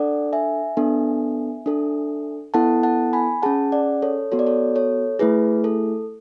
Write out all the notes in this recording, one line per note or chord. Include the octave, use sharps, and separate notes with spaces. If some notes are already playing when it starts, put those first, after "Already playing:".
Already playing: D4 A4 D5 F#5
E5 G#5
B3 D4 A4
D4 A4
B3 E4 A4 F#5 A5
F#5 A5
G#5 B5
C#4 G#4 F#5 A5
D5 F#5
A4 C#5
B3 F#4 A4 C#5
D5
A4 C#5
A4 C#5
A3 E4 G#4 B4
A4